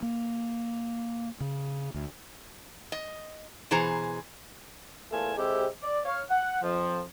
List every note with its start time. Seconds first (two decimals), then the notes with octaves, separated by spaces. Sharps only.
0.02 A#3
1.41 C#3
1.94 D2
2.92 D#5
3.71 B2 E3 G#4 C5 A#5
5.11 E2 A3 A#3 F4 G#5 A5
5.37 C3 G#3 C4 E4 G4 A4
5.83 D5
6.05 C#5 F5
6.30 F#5
6.62 F2 F3